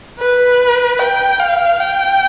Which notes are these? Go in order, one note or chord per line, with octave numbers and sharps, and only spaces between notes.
B4
G5
F5
G5